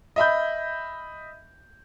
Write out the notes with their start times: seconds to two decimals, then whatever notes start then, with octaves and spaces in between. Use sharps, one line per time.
0.16 D#5 E5 B5 G6